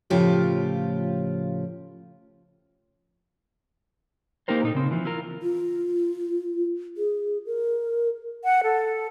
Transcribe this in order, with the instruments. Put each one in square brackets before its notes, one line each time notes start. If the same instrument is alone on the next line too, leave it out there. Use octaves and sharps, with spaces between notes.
[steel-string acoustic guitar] A2 C#3 F3 F4 G4
[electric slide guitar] A#3 D#4 G4 A#4 C5
A#2 D#4 A4
C#3 C4
E3 F3
E4 F4 A#4
[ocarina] F4
G#4
A#4
[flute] F#5
A4